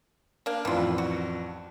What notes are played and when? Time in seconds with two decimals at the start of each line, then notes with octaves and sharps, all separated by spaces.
0.46 A#3 D4 F5
0.65 A1 F2 E3 F4 D5
0.98 F#4